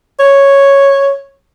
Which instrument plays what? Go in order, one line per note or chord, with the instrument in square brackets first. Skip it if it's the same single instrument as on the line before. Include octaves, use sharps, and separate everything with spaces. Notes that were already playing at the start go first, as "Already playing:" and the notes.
[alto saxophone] C#5